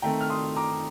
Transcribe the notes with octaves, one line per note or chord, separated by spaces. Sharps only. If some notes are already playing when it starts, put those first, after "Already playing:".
D#3 A3 C4 G5 A#5
F6
C6 D#6
A#5 D6